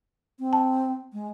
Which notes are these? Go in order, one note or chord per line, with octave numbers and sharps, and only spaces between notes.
C4
A5
G#3